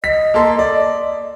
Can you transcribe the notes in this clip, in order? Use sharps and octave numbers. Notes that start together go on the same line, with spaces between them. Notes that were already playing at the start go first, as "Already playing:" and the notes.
D#5 B6
A#3 A4 C6
D5